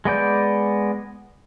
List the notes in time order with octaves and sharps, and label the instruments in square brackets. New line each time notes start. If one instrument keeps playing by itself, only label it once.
[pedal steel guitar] G#3 B3 D5 G6